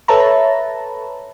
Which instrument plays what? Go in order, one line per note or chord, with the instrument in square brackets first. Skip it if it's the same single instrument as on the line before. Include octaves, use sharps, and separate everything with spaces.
[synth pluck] A4 B4 C#5 E5 A5 A#5